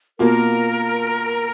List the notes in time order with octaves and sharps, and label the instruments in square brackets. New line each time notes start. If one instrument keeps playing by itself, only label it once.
[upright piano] B2 A#3 F4 [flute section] A#4